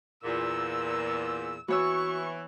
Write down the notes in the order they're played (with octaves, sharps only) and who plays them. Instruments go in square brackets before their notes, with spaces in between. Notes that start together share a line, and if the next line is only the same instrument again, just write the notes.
[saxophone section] E2 A#2 [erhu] E6
[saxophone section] E3 [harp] B3 C#5 E6 [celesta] F#4 [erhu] C#6